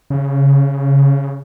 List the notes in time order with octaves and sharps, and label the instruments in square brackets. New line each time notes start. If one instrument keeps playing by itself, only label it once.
[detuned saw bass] C#3